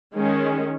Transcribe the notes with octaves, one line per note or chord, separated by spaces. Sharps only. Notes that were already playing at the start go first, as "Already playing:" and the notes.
D#3 G#3 C#4